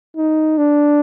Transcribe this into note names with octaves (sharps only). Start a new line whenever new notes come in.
D#4
D4